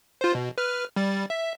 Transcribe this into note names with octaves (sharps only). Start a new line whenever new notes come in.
F4 C5
B2
B4 F6
G3 A6
E5